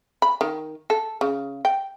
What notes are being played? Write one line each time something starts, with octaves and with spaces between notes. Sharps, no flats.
B5
D#3
A4
C#3
G5